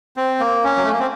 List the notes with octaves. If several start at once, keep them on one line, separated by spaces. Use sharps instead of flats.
C4
A#3
C#4
F#3
A3
A#3
C4